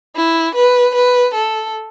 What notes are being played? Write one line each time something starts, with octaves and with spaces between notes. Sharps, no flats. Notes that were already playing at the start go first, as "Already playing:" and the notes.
E4
B4
B4
A4